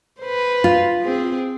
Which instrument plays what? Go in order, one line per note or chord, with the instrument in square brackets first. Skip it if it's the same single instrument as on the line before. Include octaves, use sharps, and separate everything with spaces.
[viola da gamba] B4 C5
[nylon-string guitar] F4
[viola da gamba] C4 G#4